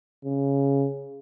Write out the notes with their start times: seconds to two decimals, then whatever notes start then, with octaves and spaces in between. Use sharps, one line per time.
0.25 C#3